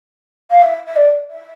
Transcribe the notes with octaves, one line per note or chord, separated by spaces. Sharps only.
F5
E5
E5
D5
E5